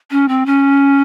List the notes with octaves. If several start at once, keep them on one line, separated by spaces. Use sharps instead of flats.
C#4
C4
C#4